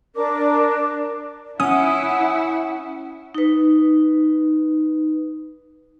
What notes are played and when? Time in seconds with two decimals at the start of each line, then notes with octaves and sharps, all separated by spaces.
0.15 D4 A#4 D6
1.60 C#4 E4 F#5 D#6
3.35 D#4 B4